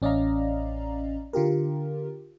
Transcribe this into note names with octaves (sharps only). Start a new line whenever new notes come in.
A1 C#4 D5 D#5 F5 A#5
D3 F4 G4 A#4